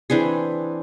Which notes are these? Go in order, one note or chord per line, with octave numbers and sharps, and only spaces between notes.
E3 C4 D4 G#4